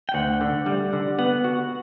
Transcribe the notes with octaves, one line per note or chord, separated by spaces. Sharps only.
G5
D2 F#5
D3
G3
D3
B3 F#5
F#4